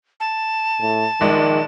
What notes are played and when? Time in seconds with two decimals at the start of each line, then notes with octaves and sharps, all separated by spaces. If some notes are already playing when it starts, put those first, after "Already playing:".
0.20 A5
0.81 A2
1.21 A#1 D#3 G#3 D5